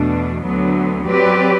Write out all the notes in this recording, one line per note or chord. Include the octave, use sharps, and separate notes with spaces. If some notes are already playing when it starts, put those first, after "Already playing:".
Already playing: E2 B2 A3 D4
D2 D3 F#3 B3
F#3 C4 G4 B4 D5